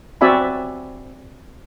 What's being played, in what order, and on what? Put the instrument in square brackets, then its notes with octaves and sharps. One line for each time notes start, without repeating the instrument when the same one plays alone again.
[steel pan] C4 F#4 D5 E5 G#5 B5